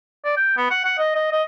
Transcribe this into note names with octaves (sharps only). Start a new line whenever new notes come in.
D5
G5
B3
F#5
F#5
D#5
D#5
D#5